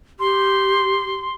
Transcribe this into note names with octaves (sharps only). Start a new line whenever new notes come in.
G4 C6